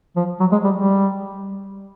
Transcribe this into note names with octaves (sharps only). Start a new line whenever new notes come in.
F3
F#3
G#3
G3
G3